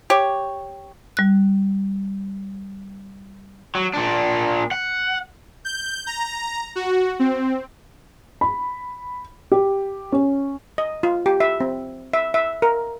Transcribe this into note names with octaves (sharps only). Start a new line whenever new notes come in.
G4 C#5
G3 F#6
F#3
A#2 D4
F#5
G6
A#5
F#4
C4
B5
G4
C#4
D#5
F4
G4
E5
C4
E5
E5
A#4